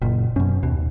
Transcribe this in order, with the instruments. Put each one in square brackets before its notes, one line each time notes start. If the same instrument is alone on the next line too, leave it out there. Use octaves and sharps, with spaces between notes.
[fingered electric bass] F#1 [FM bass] A#2
[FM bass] F#2 [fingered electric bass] B2 C#4
[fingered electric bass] D#2 [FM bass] B2